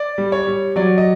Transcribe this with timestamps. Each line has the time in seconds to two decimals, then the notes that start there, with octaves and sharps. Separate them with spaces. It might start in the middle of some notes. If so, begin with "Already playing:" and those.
Already playing: D5
0.18 G3
0.32 C#5
0.47 G3
0.76 F#3 D5
0.98 D#5